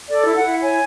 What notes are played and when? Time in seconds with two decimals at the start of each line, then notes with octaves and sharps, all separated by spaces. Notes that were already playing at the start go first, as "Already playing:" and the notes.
0.09 A4 D5
0.26 E4
0.35 F#5
0.44 E4
0.61 C#5 G#5